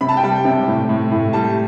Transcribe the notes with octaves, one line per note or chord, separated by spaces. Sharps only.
C3 B5
A5
G5
G3 A5
C3
A2
A2
A2
G3 A5